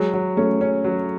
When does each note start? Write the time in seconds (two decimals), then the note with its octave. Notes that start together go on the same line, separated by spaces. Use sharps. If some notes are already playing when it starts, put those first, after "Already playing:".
Already playing: F#3 G#3
0.13 F#3
0.37 A3 C#4
0.61 C#4
0.84 F#3